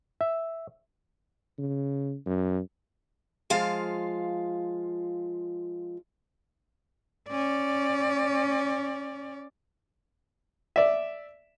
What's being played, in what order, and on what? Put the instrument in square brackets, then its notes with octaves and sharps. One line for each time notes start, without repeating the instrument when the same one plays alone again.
[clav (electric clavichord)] E5
[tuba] C#3
F#2
[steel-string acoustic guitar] F3 G#3 F4 F5
[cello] C#4 D5
[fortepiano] D5 E5